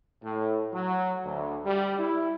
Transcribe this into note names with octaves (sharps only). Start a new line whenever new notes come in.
A2
F#3
D2
G3
E4